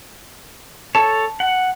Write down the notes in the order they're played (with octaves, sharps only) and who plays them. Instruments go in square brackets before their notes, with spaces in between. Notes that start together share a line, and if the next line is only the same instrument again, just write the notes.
[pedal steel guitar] A4 C#5 [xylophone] A5
[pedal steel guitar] F#5